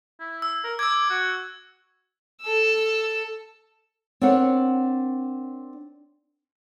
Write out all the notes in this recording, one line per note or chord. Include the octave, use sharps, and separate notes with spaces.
E4
E6
A#4
D6 E6 G#6
F#4
A4 E6
C4 D4 A#4 C#5 F#5